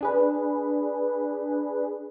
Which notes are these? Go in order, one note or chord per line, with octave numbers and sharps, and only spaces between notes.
D4 G#4 B4